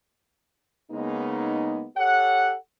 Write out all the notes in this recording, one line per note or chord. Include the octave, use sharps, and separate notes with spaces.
C#3 G#3 A#3 B3 D#4
G4 A4 C#5 F#5